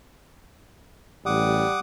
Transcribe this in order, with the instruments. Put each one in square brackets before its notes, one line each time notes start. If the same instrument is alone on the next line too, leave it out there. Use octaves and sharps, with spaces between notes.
[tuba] A1 [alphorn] G3 [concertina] F#5 D6 D#6